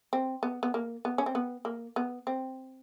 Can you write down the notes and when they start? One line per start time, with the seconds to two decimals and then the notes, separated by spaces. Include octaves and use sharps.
0.13 C4
0.43 B3
0.63 B3
0.74 A#3
1.05 B3
1.18 C#4
1.26 C4
1.35 B3
1.65 A#3
1.96 B3
2.27 C4